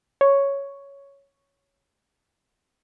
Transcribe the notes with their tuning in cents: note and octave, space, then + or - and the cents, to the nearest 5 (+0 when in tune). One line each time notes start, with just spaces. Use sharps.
C#5 +0